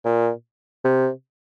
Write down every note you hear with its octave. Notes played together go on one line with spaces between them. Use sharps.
A#2
C3